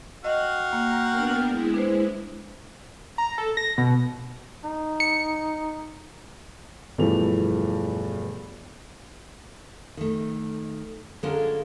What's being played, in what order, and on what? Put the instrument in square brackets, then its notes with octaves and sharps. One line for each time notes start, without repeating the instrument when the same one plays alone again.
[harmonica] F#4 F5 G5 [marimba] D#5
[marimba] A#3 [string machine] A#5
[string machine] B3 D4 A#4
G#3 E4
[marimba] D4 B4 C5
[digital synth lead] A#5
A4
A#6
B2
[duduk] D#4
[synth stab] C#7
[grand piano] E1 G2 E3 F3 A3 F7
[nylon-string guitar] D#3 A3
D3 G#3 C#4 F4 A4 A#4